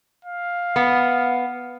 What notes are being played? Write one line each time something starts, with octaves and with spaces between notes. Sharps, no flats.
F5
B3